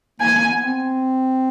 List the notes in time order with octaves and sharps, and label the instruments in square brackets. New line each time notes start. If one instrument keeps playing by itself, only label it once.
[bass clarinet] A#3 [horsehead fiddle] G#5
[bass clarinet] A#3
B3
C4